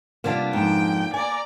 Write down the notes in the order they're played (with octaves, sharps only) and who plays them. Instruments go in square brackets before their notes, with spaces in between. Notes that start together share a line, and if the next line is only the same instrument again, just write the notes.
[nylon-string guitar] C3 G3 F4 [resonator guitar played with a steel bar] A#3 B3 D4
[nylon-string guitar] F2 G#2 [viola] G5
[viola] D5 A#5 [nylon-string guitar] G#5